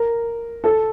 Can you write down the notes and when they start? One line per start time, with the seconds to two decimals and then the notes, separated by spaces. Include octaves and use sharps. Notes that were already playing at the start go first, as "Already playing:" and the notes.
Already playing: A#4
0.64 A4